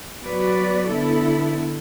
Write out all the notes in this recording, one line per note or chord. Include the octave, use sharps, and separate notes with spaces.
F#3 B3 F#4 B4 D5
D3 B3 E4 A4